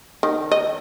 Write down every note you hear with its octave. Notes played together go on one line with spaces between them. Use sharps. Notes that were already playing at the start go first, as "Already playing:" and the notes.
D#3
D#5